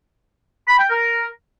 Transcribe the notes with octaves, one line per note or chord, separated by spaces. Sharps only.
B5
G5
A#4